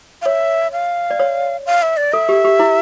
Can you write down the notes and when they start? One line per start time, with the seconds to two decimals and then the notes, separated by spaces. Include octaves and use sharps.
0.22 F5
0.26 C#5 E5
0.72 F5
1.10 D5
1.19 C#5
1.66 F5
1.82 E5
1.97 D5
2.13 A4 E5
2.29 G4
2.44 G4
2.59 E4